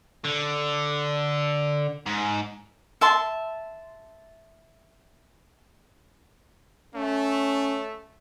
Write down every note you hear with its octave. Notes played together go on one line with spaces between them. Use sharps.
D3
G#2
E5 A5 C6
A3 C#4